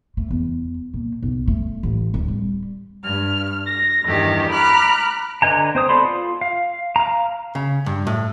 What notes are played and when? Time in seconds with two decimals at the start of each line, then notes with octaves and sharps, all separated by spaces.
0.17 A3
0.31 E2
0.94 A#2
1.23 B1
1.47 A3
1.83 A1
2.14 D1
2.28 G3
3.03 G2 F6
3.65 A#6
4.05 E2 G2 D#3 G4
4.51 A#5 B5 D6 F6 F#6
5.42 D3 B4 D#5 G#5 A#5
5.75 C4 C5 D#6
5.89 B3 A4 D5 B5 C6
6.05 F4
6.41 F5
6.96 F5 A#5
7.55 C#3
7.86 G2
8.07 A2